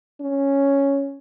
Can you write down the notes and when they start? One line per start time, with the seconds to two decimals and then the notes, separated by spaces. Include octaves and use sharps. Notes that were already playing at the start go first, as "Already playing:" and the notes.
0.21 C#4